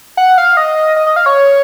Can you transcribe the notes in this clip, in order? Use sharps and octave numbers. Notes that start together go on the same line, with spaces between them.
F#5
F5
D#5
D#5
D#5
F5
C#5